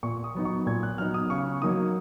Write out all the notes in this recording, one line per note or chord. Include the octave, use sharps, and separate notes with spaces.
A#2 C#6
D#6
F#3 B3 D#4
C#6
A#2 G#6
F#6
F#3 B3 D#4 F6
D#6
C#3 C#6
F#3 A#3 D#4 D#6